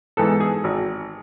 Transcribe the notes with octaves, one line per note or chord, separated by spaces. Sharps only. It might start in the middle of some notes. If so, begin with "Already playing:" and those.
G#2 E3 B3 A4
G#4
G#1